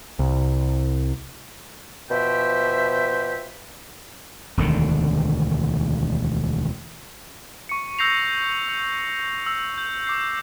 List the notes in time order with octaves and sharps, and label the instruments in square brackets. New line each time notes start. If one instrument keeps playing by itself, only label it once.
[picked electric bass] C2
[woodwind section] B2 F3 G4 C5 E5
[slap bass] E1 D2 D3 D#3
[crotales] C#6 C#7
E6 G6 A#6 C7 F7
E6 C#7
E6
G6
D6 C7